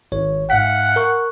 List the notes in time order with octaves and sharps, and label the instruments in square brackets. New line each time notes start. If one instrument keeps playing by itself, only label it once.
[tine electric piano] G#1 C#5
[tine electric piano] G#2 F5 B6 [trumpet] F#5
[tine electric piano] A#4 C#6 F#6